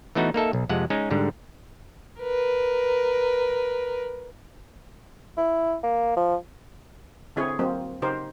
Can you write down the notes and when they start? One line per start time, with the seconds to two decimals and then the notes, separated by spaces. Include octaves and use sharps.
0.15 E3 A3 B3 D#4 F#4
0.34 A#3 D#4 A4 E5
0.53 B1
0.69 F2 C3 G#3 F#5
0.90 G#3 C#4 D#4
1.11 G#2 D3 G3
2.22 A#4 B4
5.37 E4
5.83 A#3
6.16 F3
7.36 D3 C4 E4 G#4 C#5
7.59 F#3 A#3 C4
8.02 C#3 D#4 G4 A#4 C5